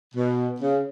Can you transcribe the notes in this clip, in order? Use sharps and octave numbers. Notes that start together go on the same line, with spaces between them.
B2
C#3